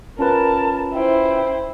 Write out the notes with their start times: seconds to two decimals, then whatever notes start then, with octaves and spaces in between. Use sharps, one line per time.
0.19 C#4 F4 A#4 B4 A5
0.93 E4 C5 G5